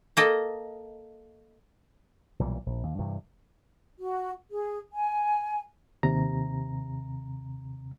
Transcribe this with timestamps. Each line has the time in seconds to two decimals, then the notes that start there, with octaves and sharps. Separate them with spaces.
0.17 A#3 A4 D#5
2.40 B1 A#2 E3 G3
2.66 A#1
2.83 D#2
2.99 G2 C3 E3
3.98 F#4
4.50 G#4
4.92 G#5
6.03 D#2 C3 A#5